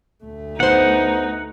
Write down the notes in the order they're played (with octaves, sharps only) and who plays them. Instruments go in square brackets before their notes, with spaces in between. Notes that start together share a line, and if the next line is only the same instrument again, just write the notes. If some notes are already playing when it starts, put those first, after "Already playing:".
[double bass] D2 A3
[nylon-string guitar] B3 C5 [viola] D#4 [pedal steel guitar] F#5